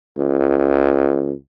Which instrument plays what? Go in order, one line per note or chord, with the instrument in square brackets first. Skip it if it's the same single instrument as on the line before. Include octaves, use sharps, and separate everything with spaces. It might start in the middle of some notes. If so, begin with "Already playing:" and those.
[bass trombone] C#2